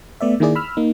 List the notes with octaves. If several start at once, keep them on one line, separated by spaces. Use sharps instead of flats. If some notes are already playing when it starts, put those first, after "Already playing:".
A3 B3 D5 E5
D#3 A#3 E4 G#4 D5
B5 E6 F6
A#3 D#4